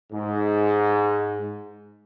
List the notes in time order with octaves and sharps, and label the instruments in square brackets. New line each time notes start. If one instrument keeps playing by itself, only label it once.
[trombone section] G#2